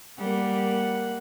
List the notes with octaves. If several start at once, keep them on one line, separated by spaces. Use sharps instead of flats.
G3 A#3 F#5